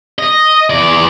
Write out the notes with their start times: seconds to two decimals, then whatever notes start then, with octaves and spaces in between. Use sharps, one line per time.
0.19 D#5
0.70 E2 D5